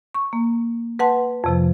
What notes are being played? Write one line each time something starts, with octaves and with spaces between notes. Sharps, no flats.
C#6
A#3
B4 F#5 A5 C6
F2 C3 F3